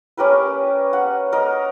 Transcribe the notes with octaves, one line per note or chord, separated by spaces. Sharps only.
C#4 G4 A#4 B4
F#5
A#4 D#5